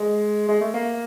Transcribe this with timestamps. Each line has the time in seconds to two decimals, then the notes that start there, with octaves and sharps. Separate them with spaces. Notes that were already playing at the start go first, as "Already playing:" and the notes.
Already playing: G#3
0.49 G#3
0.61 A3
0.74 A#3